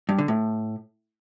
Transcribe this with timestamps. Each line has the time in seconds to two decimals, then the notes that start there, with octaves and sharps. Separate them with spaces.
0.09 G2
0.18 D3
0.28 A2